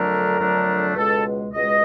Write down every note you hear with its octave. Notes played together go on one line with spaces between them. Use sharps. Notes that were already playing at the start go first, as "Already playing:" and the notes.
Already playing: F2 D3 F#3 A3 D4 A#4
F2 D3 F#3 A3 D4
C#2 B2 G#3 A4
C#2 B2 G#3 D#5